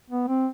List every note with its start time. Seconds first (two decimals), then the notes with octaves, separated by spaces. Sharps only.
0.10 B3
0.28 C4